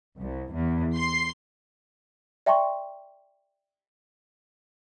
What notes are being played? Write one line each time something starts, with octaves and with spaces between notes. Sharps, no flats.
C2
E2
C6 C7
D5 E5 G5 A5 C6 C#6